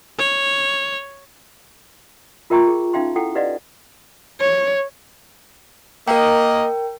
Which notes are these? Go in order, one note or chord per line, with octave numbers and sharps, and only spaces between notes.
C#5
F4 A#4 E5 G5 A#5 C#6
G#4
C#4 D#4 E5 F5 G5 C6
E4 A4 F#5 G5
G4 B4 D5 D#5 F5 F#5
C#5
A#3 A#4 D#5 G5